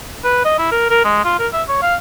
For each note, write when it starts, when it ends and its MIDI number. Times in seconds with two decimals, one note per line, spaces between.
0.24 0.41 71
0.45 0.57 75
0.58 0.70 64
0.72 0.85 70
0.90 1.02 70
1.04 1.24 56
1.24 1.38 65
1.39 1.47 70
1.53 1.62 76
1.68 1.82 73
1.82 1.95 77